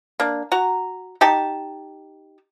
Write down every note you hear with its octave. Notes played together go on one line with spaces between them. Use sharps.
A#3 D4
F#4 A#5
D#4 G4 A5